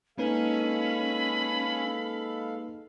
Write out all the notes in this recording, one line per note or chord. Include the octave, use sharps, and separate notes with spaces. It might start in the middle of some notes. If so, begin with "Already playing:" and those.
G#3 A#3 C#4 D#4 A4 B4 F5 B5